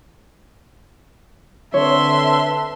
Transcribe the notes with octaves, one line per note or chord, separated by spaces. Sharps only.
D3 C4 B4 C#5 E5 A5 C6